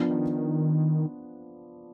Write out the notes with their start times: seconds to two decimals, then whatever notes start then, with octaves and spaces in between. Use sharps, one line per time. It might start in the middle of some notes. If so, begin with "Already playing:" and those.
Already playing: F3 B3 D4
0.10 D#3